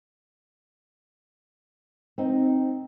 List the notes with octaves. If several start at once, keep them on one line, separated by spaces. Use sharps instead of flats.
C4 D#4